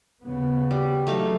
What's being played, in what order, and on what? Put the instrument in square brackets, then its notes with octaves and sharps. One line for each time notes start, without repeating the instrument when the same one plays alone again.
[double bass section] D#2 C#3 B3
[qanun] G3
[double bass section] C#3 E3 F#3 [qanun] A3 D#4 F5